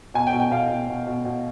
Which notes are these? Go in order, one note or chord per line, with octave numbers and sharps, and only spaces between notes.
B2 G#5
G5
B2
G5
B2 F5
B2
B2
B2
B2